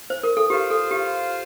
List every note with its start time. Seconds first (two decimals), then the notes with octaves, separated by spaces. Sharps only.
0.10 C5
0.23 A#4
0.37 A4
0.50 F4 G4 C5 F5
0.70 A4
0.91 G4